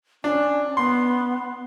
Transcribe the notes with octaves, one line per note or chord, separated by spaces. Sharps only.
C#4 D4
B3 C6